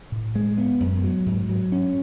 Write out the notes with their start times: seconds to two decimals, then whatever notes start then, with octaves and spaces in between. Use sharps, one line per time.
0.12 A2
0.35 G#3
0.58 B3
0.80 F#2
1.04 F#3
1.26 G#2
1.49 F#3
1.72 C#4